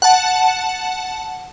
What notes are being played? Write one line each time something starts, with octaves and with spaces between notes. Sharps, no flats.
F#5 A5